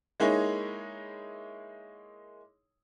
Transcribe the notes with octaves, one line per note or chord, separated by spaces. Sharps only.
G#3 A#3 D#4 E4 G#4 C#5